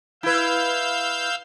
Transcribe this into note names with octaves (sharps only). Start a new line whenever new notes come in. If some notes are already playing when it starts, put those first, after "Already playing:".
E4 B4 F5 E6 G6